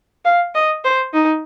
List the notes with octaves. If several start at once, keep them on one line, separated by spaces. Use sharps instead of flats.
F5
D#5
C5
D#4